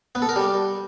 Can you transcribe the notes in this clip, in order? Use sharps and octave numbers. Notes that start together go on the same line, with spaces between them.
B3
A4
A#4
G3